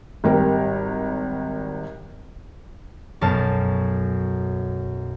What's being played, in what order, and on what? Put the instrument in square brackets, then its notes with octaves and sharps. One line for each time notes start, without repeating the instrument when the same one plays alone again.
[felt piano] G#1 G3 A#4
[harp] B1 F#2 B3 A5 F6